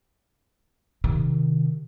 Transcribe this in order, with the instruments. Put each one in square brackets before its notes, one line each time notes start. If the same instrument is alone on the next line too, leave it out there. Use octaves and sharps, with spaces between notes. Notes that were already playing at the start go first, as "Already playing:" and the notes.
[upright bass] C3 D#3